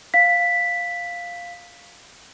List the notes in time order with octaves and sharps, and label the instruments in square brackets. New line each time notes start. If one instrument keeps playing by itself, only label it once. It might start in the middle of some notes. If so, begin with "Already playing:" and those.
[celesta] F5 B6